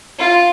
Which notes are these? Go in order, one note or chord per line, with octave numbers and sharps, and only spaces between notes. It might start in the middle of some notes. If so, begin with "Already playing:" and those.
F4